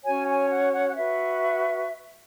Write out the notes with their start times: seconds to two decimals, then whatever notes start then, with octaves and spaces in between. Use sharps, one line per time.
0.05 C#4 F#4 C#5 G#5
0.28 G#5
0.51 F#5
0.73 F#5
0.89 F#5
0.96 F#4 B4 E5